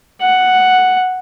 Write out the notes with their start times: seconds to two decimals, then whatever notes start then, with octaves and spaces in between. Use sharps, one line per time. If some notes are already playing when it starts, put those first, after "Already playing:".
0.21 F#5